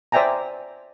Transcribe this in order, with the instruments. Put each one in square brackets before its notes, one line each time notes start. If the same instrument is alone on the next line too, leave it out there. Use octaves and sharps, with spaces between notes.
[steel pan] C5 D5 E5 G5 G#5 A#5